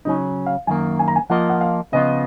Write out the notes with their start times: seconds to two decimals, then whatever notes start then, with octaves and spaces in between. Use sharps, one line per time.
0.05 C#3 F#3 C#4 D#4
0.46 F5
0.67 F#2 D#3 A#3 G#5
0.99 G#5
1.08 A#5
1.16 G#5
1.30 F3 A#3 F4 A#4 D#5 F#5
1.49 F#5
1.61 F5
1.93 C#3 F3 B3 F4 D#5